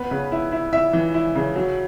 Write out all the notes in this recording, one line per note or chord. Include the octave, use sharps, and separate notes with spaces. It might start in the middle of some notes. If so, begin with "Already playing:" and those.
Already playing: B3 B4
C#3
E4
E4
E4 E5
E3
E4
C#3
F#3